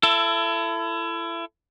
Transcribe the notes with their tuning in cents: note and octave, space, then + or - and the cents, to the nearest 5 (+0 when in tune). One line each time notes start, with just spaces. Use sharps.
E4 +30 A4 +15